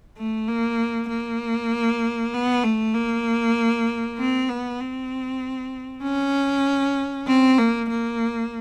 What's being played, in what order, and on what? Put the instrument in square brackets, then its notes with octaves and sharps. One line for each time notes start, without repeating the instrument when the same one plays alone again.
[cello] A3
A#3
A#3
B3
A3
A#3
C4
B3
C4
C#4
C4
A#3
A#3